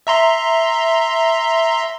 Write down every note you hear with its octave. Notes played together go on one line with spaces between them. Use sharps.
E5 A#5 C6